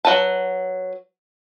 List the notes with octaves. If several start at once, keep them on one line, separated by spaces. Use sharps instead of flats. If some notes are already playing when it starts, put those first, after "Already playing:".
F#3 F#4 B4 A5